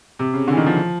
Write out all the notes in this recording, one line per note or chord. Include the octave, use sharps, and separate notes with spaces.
C3
C#3
D3
E3
D#3
F3